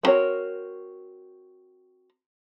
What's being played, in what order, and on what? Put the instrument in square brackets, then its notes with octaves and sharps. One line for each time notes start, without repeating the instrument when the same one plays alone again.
[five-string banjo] B3 C4 F#4 A#4 C#5